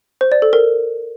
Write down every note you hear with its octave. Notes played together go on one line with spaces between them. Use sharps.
C5
D5
A4
A#4